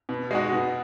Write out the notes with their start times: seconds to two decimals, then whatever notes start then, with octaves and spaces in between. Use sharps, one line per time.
0.09 B2
0.31 G#3 D#4 F#4
0.52 B2